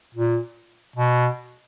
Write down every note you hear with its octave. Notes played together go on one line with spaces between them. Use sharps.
A#2
B2